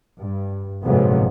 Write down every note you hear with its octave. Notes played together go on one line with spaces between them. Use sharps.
G2
A#1 F2 G#2 C3 F#3 B3